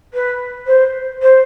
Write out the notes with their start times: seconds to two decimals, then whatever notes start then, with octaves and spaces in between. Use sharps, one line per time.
0.13 B4
0.66 C5
1.22 C5